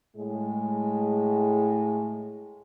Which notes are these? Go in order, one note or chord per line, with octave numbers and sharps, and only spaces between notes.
A2 G#3